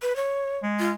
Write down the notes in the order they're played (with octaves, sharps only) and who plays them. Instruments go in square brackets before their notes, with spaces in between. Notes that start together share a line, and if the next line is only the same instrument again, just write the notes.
[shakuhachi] B4
C#5
[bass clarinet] G#3
[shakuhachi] F4